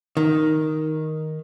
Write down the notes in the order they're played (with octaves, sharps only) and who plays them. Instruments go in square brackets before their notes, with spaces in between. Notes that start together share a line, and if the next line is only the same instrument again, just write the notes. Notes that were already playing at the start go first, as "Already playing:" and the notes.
[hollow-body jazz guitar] D#3